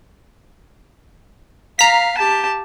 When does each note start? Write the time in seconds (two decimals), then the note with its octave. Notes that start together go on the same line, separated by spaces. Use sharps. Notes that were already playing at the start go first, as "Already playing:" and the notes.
1.79 F5 A#5 B6
2.18 G4 A5